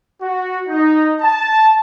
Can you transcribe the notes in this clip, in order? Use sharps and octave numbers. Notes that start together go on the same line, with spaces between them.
F#4
D#4
A5